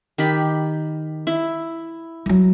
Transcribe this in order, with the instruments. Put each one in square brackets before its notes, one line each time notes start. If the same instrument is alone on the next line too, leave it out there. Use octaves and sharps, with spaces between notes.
[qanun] D#3 G4 B5
E4
[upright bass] F3 F#3